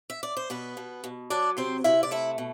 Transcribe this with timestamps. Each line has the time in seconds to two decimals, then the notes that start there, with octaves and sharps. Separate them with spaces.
0.10 E5
0.23 D5
0.37 C5
0.50 B2 B3 B4
0.77 B2
1.04 B2
1.30 F#3 D4 D5
1.57 C3 C4 C5
1.84 C3 E4 E5
2.03 D5
2.11 A3 E4 E5
2.38 B2